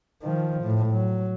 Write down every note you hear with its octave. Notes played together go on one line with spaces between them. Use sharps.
D#3 F3
A2
F#3